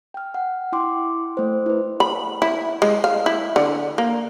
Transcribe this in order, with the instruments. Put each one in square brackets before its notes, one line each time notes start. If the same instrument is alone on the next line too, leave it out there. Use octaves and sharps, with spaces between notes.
[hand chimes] G5 F6
F#5
E4 G5 C6 D6
A3 C5
E4 B4
[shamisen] B5
E4
G#3
F5
E4
D3
A#3